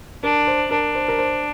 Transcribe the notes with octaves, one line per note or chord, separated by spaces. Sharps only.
D4 A#4
C5
D4 A#4
C5
A#4
C5